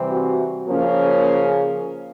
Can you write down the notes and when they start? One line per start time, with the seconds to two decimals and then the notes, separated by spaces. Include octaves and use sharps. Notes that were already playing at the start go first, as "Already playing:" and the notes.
Already playing: C3 E3 G3 C4
0.09 F#4
0.68 C#3 F3 A#3 C#4